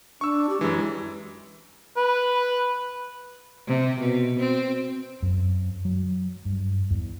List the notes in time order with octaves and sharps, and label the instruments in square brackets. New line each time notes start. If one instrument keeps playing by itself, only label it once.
[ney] D4 [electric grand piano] C#6 E6
[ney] G4
[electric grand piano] F#2 E3 [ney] G#3
[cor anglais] B4
[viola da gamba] C3
B2
C4
[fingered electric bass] F#2
F#3
G2
E2